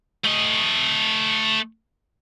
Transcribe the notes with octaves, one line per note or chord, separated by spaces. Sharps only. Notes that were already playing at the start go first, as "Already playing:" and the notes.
A3 D#5